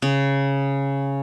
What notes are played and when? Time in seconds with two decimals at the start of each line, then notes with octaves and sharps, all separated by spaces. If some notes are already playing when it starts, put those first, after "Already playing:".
0.02 C#3